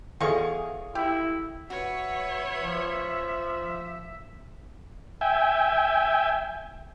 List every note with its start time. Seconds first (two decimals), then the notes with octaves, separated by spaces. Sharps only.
0.21 E2 B2 G#4 A4 F5 C#6
0.95 E4 G4
1.70 F#4 B4 C#5 E5
2.61 F3
5.21 E5 G5 G#5